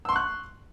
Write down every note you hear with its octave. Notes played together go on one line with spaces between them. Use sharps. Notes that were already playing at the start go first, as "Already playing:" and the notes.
C6 C#6 E6 F#6